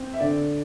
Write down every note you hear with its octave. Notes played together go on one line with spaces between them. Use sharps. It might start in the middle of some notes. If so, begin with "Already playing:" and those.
Already playing: C4
E5
D3 D5